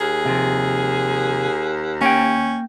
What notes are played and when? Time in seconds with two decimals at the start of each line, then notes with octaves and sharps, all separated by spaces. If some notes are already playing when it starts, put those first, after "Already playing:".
0.01 D#2 G#4
0.26 C3 F3
2.01 A#3 C#4 G5